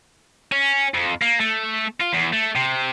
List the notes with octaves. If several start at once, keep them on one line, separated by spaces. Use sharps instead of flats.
C#4
F2
A#3
A3
F4
E2
A3
C3